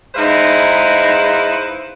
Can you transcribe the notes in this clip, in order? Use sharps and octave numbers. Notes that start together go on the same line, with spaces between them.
G#3 D#4 E4 B4 C5 F5